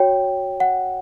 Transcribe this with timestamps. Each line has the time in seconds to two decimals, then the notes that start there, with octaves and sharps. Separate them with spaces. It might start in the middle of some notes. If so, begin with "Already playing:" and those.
Already playing: F#4 C#5 G5
0.60 F#5